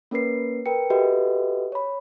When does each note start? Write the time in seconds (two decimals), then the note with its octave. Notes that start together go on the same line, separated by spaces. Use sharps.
0.11 A#3 C#4 A#4 B4 C7
0.66 A#4 B4 G5 C#7
0.90 F#4 G4 A4 B4 D#5 E5
1.72 C#5 B5